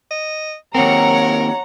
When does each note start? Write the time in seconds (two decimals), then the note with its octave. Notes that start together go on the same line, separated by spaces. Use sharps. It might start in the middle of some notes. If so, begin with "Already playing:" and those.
0.11 D#5
0.75 D#2 C4 A#4 C#5 F#5 A#5